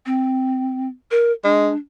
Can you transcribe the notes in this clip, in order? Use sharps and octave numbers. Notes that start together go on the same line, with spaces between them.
C4
A#4
G#3 D4